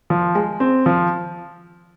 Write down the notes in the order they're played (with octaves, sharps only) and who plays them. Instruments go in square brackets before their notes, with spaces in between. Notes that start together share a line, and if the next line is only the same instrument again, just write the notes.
[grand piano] F3
G#3
C4
F3